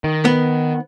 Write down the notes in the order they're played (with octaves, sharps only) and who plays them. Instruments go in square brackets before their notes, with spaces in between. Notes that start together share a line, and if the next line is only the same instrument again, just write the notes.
[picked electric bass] D#3
[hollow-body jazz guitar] B3